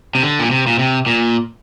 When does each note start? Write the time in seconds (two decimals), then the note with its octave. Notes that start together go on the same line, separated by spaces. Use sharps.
0.15 C3
0.23 D3
0.39 A#2
0.51 C3
0.67 A#2
0.79 C3
1.06 A#2